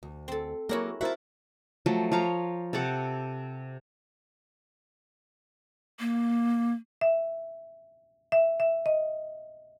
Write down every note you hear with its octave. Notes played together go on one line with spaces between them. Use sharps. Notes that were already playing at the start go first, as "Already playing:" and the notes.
D2
C4 A4
F#3 A#3 E4 F#4 G#4 A#4 C#5
E4 F#4 A#4 C5 E5 F#5 A5
F3 F#3 A3
F3 C#5 F5 A#5
C3 A4 F#5 D6
A#3
E5
E5
E5
D#5